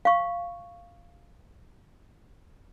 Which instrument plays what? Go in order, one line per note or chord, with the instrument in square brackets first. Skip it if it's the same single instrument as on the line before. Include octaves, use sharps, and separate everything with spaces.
[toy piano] F5 C#6